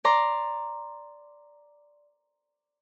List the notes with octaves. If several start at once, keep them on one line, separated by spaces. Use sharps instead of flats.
D5 A#5 C6 D6